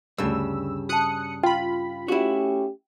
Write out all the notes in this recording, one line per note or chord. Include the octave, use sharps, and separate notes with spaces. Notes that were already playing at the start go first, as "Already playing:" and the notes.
D2 G2 C#3 E6
F#4 A5 D#6 F#6 C#7
F4 G5 B5
A3 C#4 E4 F#4 G4